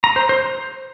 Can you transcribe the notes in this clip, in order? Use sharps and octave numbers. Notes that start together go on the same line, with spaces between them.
A#5
C5
C5